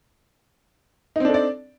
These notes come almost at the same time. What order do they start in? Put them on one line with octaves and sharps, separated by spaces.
D#4 C4 D4 A4 D5